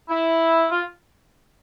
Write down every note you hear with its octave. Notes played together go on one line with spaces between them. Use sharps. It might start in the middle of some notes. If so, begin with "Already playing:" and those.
E4
F4